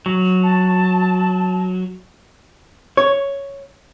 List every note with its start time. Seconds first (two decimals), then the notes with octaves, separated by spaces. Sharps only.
0.06 F#3
0.43 A5
2.97 C#5